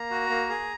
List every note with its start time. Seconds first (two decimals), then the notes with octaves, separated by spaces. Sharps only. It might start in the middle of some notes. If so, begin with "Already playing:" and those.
Already playing: A#3 A#5
0.11 F#4
0.29 A#3
0.49 G#4